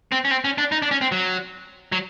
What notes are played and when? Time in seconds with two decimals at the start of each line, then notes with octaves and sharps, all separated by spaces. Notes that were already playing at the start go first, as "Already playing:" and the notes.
0.12 C4
0.25 C#4
0.31 C4
0.45 C#4
0.58 D4
0.72 D#4
0.82 D4
0.91 C#4
1.01 C4
1.12 F#3
1.92 F#3